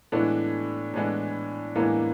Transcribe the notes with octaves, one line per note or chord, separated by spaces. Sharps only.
A2 E3 G#3 A3 B3 D4
A2 E3 G#3 B3 D4
A2 E3 G#3 A#3 B3 D4